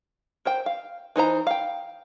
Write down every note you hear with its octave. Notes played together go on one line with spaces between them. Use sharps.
A#4 C5 G5
F5
E3 D#4 C5 A#5
F5 G5